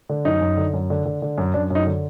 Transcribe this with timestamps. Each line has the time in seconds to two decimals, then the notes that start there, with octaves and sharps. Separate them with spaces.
0.09 D3
0.25 F#2 D#4
0.41 F#2
0.57 D3
0.73 F#2
0.90 D3
1.05 D3
1.22 D3
1.38 F#2
1.54 F#2 D4
1.70 F#2 D#4
1.87 D3